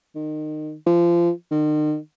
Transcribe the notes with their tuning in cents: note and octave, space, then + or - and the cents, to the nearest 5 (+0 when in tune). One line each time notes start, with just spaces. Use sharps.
D#3 -25
F3 -25
D#3 -40